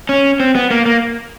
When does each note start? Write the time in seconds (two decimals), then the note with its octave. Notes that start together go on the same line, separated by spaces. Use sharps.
0.09 C#4
0.40 C4
0.55 B3
0.71 A#3
0.86 A#3